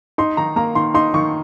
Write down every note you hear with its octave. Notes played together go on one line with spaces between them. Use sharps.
D#4 C6
D#3 A#5
A#3 A#5
D#3 C6
D#4 C6
D#3 C#6